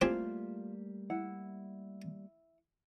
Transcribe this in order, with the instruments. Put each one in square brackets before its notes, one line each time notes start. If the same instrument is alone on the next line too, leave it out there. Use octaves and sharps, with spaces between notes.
[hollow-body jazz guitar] G3 A3 A#3 [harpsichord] C4 G4 G#4 [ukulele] F4
[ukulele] E4 F#5